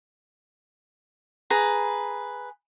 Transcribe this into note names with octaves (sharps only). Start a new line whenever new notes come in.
G#4 B4 A#5